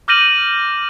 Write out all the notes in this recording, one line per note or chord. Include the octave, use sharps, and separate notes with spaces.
D6 F6 G6 A#6 D#7 F#7